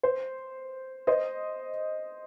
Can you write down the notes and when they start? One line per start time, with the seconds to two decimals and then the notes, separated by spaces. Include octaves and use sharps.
0.03 C5
1.07 C5 D#5